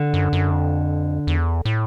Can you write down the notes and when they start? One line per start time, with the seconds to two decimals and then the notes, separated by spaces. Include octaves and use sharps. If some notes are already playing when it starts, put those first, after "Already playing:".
Already playing: D3
0.14 F#2
0.33 F#2
0.51 F2
1.27 E2
1.65 A2